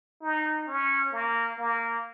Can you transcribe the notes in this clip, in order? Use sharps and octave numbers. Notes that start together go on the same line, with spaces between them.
D#4
C#4
A#3
A#3